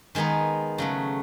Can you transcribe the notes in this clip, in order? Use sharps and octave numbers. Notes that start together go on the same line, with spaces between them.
D#3 G#3 B3 D#4
C#3 F#3 A3